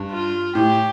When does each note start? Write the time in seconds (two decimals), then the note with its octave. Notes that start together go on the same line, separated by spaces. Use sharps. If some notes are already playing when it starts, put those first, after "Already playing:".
Already playing: G2
0.11 F4
0.55 A2 G4